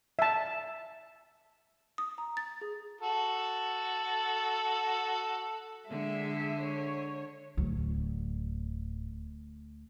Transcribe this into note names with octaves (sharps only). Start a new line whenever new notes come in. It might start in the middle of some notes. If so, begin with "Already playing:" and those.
E5 A5
D#6
A#5
A6
G#4
F#4 A4
D3 G#3 E5
C#5
D1 D2 F#3